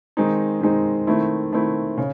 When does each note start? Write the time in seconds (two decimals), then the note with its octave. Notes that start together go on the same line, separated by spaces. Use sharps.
0.17 D#3 G#3 C4 D#4
0.61 D#3 G#3 C4 D#4
1.07 D#3 A3 C4 E4
1.52 D#3 A3 C4 E4
1.98 C#3